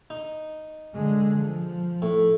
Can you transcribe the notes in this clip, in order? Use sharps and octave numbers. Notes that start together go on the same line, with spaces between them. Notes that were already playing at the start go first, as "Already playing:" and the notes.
D#4
D3 G#3
F3
A2